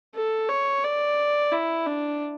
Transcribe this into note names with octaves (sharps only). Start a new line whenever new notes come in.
A4
C#5
D5
E4
D4